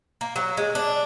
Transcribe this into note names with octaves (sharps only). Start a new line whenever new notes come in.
A#3
F#3
G#3
D4